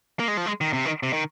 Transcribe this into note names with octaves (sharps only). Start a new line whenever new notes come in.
A#3
G#3
F3
G#3
D#3
C3
D#3
C3
D#3